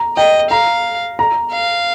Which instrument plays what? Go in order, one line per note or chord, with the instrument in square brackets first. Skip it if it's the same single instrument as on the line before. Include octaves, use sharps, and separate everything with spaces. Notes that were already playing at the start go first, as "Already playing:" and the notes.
Already playing: [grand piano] A#5
[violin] D#5 [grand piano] G5
[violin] F5 [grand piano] A#5
[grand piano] A#5
[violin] F5